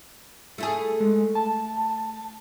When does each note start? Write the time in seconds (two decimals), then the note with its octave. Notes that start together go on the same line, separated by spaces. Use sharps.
0.58 A3 E4 G#4
1.00 G#3
1.35 A5